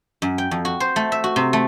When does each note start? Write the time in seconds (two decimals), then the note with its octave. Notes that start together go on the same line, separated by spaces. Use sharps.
0.22 F#2
0.38 G5
0.51 F2
0.65 F#4
0.80 C5
0.96 A3
1.12 E5
1.24 F#4
1.36 C3
1.53 A3